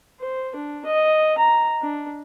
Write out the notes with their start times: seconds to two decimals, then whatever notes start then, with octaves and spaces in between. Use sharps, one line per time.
0.20 C5
0.55 D4
0.85 D#5
1.38 A#5
1.82 D4